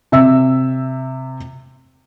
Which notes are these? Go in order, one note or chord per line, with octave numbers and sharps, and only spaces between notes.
C3 E5 E6